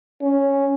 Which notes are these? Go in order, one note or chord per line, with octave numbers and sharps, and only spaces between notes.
C#4